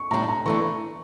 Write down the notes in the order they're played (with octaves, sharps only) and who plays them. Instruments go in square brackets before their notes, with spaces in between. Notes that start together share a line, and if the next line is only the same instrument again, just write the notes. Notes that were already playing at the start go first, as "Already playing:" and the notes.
Already playing: [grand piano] C#6
[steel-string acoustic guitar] A2 G3 D4 [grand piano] A#5
[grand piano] A#5
[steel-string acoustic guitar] E3 A3 D4 [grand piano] C#6